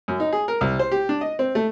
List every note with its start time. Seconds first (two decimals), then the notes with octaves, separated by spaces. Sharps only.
0.08 F#2
0.20 D#4
0.33 G#4
0.48 A#4
0.61 C2
0.79 C5
0.91 G4
1.09 D4
1.21 D#5
1.39 C4
1.55 A3